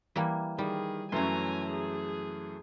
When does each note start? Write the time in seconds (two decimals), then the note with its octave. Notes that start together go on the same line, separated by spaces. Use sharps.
0.16 E3 G3 A#3
0.58 D#3 G3 G#4
1.12 F#2 E3 A3 C#4 G#5 A#5 C6
1.71 G#4